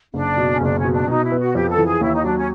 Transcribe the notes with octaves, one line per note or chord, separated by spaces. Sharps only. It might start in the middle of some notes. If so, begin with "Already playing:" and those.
F#1 D4
B2
C#4
F#1 D4
C#4
B2
D4
B2 D#4
E4
B3
F#4
F2 G4
A4
E3
G#4
D#2 E4
D#4
F#3 D4
C#4